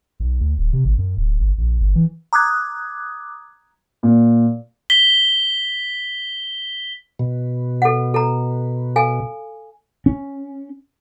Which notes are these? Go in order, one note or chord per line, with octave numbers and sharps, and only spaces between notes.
B1
D2
D1
C3
G#1
F#2
D1
G1
A#1
G1
E3
A#5 D6 D#6 F#6 G#6
A#2
B6 G7
B2
A4 F#5
A4 A#5
A4 F5 G#5
C#4